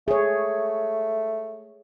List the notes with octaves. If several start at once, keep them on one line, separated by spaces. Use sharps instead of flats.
A3 G#4 C#5